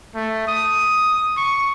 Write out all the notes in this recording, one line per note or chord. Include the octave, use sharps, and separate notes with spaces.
A3
D#6
C#6